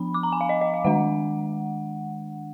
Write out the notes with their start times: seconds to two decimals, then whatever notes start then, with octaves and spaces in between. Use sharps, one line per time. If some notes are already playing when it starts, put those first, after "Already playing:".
Already playing: F3 B3 D4 B5
0.14 D6
0.23 A#5
0.32 G#5
0.41 F5
0.49 D#5
0.61 D#5
0.74 F5
0.85 D#3 G#3 D4 F#5